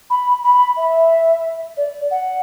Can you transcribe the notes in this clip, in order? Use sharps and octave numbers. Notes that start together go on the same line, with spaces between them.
B5
B5
E5
D5
F#5